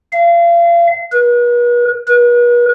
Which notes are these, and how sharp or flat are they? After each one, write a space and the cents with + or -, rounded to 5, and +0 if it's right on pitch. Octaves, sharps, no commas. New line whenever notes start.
F5 -35
B4 -40
B4 -40